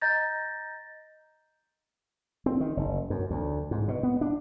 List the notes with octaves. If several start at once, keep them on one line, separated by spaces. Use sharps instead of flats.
D#5 A#5 G6 A6 A#6
C4
D#3
F#1
F#2
D2
G#2
B2
B3
D4